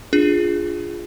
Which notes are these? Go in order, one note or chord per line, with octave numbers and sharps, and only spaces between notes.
D4 F4 G#4